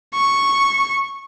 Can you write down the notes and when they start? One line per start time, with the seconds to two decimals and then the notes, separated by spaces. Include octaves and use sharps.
0.14 C#6